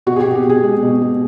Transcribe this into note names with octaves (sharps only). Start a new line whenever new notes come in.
B2 F#4
G#4
G4
B2
G4
B2 G#4
G#3
B2
G#3